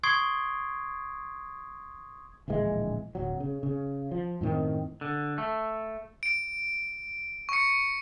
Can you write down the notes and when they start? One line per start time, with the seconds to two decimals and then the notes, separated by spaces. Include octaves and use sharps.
0.03 C6 C#6 D#6 G#6 C7 D7
2.48 D1 A#1 E3 G#3
3.15 D1 F#3
3.40 C#3
3.63 C#3
4.11 F3
4.41 F#2 A2 D#3 C4
5.01 D3
5.38 A3
6.23 D7
7.49 C#6 C#7